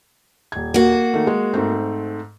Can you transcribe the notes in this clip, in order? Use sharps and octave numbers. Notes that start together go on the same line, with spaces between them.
D#1 G#6
A#3 F#4
D#3 A3
G#3
G#2 A3 C4